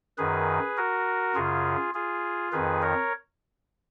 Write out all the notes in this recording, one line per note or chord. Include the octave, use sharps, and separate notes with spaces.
F#2 D#3 G#4 B4
F#4 A#4
F#2 C#3 F4 G#4
F4 G#4
F2 D#3 G#4 B4
A#4 C#5